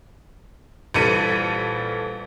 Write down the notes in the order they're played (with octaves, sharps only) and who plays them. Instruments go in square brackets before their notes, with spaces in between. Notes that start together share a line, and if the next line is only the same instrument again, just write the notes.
[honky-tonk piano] A#1 E3 G3 A4 C#7 D#7